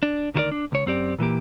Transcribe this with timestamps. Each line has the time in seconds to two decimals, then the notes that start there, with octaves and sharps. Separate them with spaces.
0.03 D4
0.35 D2 D#3 E4 F#4 A#4 D5
0.52 D4
0.72 C#2 C#5
0.86 F#2 C4 G4 D5
1.18 A#2 E3 A#3 G4